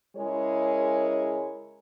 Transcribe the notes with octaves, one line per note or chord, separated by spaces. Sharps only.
C#3 G#3 E4 G#4 A#4 C#5